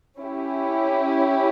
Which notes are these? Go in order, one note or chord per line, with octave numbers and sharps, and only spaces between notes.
C#4 E4 G4